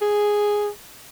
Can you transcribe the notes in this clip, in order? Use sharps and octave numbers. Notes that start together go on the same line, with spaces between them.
G#4